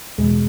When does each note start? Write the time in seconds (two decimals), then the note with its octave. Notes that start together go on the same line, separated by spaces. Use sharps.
0.18 E2 B2 G#3